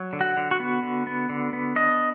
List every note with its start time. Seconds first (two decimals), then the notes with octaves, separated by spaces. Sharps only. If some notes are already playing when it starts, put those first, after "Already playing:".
Already playing: F#3
0.13 D3
0.21 F#4
0.37 D3
0.51 F#4
0.60 B3
0.83 D3
1.07 B3
1.29 D3
1.53 B3
1.76 D4 D#5